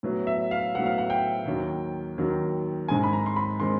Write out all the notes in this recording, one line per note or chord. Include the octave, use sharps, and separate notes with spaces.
A2 F#3 B3
E5
F5
A2 F#3 B3 F#5
F5
F#5
G5
D#2 D#3 F#3
D#2 D#3 F#3
G#2 D#3 G#3 C4 G#5
B5
A#5
C6
B5
D#3 G#3 C4 C6